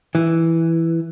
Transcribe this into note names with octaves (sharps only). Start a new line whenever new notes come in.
E3